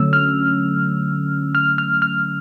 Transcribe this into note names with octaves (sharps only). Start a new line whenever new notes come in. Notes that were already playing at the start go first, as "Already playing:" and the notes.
Already playing: D3 F#3 A3 C#4 E6
F6
F6
F6
F6